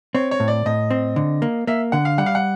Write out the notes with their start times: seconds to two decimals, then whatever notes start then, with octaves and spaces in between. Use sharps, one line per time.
0.15 C4 C#5
0.31 C#5
0.40 A2
0.48 D5
0.66 A2 D#5
0.91 C4
1.16 D3
1.42 A#3
1.67 A#3 E5
1.92 D3 F#5
2.05 F5
2.18 G3 F#5
2.26 F5
2.35 F#5